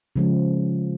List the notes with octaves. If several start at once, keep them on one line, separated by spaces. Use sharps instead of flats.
C#3 F3 G#3